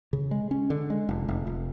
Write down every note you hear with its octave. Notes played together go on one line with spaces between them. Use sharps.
C#3
G#3
C#4
D3
G#3
F1
F1
F1